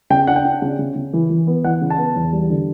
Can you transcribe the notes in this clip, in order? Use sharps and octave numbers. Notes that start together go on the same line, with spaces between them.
C#3 G5
D4 F#5
G5
D4
C#3
C#3
C#3
E3
E3
B3
E3 F#5
C#3
A5
B3
E2
G3
D3